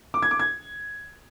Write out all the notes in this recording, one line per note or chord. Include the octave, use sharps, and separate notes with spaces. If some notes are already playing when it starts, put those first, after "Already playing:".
D6
G#6
D6
G#6